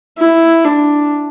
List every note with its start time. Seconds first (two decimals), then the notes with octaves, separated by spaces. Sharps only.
0.18 E4
0.64 D4